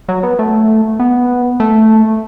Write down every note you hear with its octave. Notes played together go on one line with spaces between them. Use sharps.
F#3
B3
A3
B3
A3